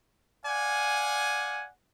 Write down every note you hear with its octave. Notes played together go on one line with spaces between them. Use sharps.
D5 F5 F#5 G#5